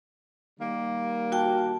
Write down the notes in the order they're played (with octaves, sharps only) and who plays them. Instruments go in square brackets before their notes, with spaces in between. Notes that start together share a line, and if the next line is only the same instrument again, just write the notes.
[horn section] D#3 G3 A#3
[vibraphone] F#4 G5 A5